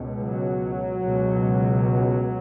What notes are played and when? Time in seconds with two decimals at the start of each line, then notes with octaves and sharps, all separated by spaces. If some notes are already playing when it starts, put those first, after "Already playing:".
Already playing: C#2 B2
0.18 F#3
1.03 C#2 B2